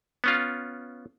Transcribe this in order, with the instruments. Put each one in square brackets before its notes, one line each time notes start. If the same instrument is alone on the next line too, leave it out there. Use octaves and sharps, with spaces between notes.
[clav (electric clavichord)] B3 C#4 F4